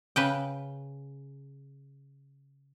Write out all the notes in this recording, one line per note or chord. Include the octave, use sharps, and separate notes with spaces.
C#3 B4 G5